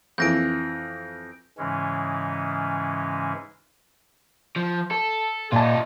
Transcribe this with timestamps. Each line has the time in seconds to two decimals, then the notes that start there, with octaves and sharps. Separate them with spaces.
0.18 F2 E3 G6 A#6 D7
1.58 G#2 C#3 E3 G#3 C#4
4.56 F3
4.91 A4
5.52 A#2 D#4 F4 A5